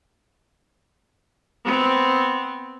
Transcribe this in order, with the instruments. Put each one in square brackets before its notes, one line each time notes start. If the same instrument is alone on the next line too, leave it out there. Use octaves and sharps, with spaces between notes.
[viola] B3 C4